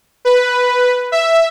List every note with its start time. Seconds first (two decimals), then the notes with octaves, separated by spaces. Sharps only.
0.25 B4
1.12 E5